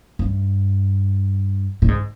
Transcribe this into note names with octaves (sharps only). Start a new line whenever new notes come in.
G2
A#2
G#2